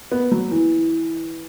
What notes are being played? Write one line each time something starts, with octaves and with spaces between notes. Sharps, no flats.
B3
F#3
E3